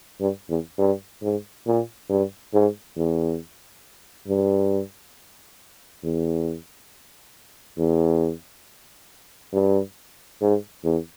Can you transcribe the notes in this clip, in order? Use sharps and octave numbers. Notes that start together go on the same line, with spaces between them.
G2
E2
G2
G#2
A#2
G2
G#2
E2
G2
E2
E2
G2
G#2
E2